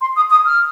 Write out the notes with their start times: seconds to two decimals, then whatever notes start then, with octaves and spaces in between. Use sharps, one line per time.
0.01 C6
0.16 D#6
0.30 D#6
0.45 F6